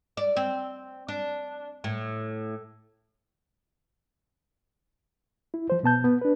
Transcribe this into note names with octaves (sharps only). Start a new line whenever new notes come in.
D5
C4
D4
A2
E4
F3 C5
B2 B3 A5 G6
B3
D4 B4